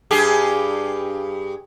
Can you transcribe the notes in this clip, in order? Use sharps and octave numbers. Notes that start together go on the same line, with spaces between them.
G2 G4 G#4